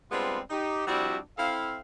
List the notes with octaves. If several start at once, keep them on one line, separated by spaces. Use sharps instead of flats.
G3 G#3 B3 C4 D4 F4
D#4 G4
F3 G3 C4 D4 E4 F#4
C4 E4 A4 F5